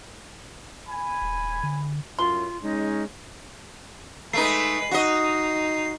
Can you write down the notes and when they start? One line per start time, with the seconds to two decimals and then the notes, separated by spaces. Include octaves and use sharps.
0.89 G#5 B5
1.21 D#1
1.63 D3
2.19 F#2 A2 F4 C6
2.63 G#3 C#4 D#4
4.33 G#3 A3 D#4 B4 C7
4.91 D#4 F#4 D#5